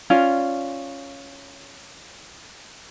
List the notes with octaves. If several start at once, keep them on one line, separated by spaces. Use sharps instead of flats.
C#4 F4 D5